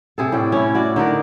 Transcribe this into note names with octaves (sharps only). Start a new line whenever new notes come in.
C3 G#4 A4
A2 D5 G5
C#4 E4
E4 F#4 D5
D3 D#4 A#4 D5